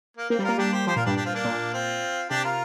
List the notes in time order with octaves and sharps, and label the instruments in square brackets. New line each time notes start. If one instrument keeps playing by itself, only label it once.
[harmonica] A#3
[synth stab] A#3 [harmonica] C4
[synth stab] G3
[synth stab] A#3 [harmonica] F4 A#4
[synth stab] G3 [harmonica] D4 G4
[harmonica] G4 C5
[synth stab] F3 [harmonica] G4 C5
[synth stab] A#2 [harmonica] F4 A#4
[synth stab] G2 [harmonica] D4 G4
[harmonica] D4 G4
C4 F4
A#3 D4
[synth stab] A#2
[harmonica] C4 F4
[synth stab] C3 [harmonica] D4 G4
[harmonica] F4 A#4